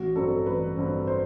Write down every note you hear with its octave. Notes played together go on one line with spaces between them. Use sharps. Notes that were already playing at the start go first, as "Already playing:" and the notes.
Already playing: A1 F#4
G2 F#3 C4 A4
A1 B4
G2 F#3 C4
C5